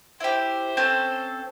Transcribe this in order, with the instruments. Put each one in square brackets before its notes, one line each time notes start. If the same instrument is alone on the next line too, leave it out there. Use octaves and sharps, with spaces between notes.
[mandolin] E4 G4 [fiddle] C5
[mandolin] C4 C#4 A4